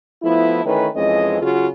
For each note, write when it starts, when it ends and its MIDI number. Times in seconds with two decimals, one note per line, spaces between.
0.23 0.61 53
0.23 0.61 57
0.23 0.61 59
0.23 0.61 64
0.65 0.87 51
0.65 0.87 52
0.65 0.87 57
0.65 0.87 61
0.65 0.87 71
0.95 1.40 41
0.95 1.40 52
0.95 1.40 56
0.95 1.40 60
0.95 1.40 61
0.95 1.40 75
1.41 1.67 49
1.41 1.67 54
1.41 1.67 65
1.41 1.67 66
1.41 1.67 68